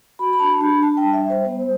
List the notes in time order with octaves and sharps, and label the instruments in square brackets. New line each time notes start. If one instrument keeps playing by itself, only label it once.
[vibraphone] F#4 B5
B5
D4 A5
D4 B5
D4 A5
G5
G3
E5
G3
C5
B3 C5